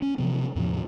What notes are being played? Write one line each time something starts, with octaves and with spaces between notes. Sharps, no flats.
C#4
C3 E3 F3 B3
E2 A2 C3 F3